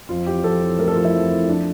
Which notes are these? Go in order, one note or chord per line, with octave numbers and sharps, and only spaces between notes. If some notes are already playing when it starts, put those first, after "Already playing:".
F2 F4
E3 G4
F2 A4
E3
A3 A#4
A4
F2 F4
E4
F2
E3
F3 D4